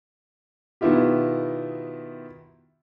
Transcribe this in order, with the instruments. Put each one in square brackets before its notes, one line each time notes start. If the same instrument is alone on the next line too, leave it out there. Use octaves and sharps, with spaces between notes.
[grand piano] B2 D#3 B3 E4 F4 G4